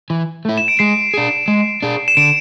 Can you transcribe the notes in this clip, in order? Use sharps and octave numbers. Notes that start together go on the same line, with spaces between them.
E3
A3 E4
E7
D7
G#3 C7
D4 G#4
G#3
D4 G#4
E7
D3 D7